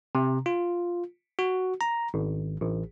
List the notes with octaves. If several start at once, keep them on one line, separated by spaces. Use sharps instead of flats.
C3
F4
F#4
A#5
G#1
A1